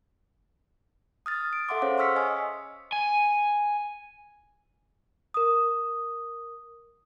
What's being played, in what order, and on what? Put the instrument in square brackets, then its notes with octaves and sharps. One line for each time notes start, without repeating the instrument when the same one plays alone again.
[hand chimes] D#6 F6 A6
D7
A4 E5 F#5 C6 D6
C#4 G#4 C5 C#5 F5
C6 C#6 E6 F6 B6 C#7
D#5 G#5 D#6
[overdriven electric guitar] G#5
[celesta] A#4 D#6